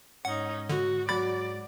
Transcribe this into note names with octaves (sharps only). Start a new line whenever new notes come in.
G#2 C#4 D#4 F#5
D3 F#4
F#3 D5 B5 A6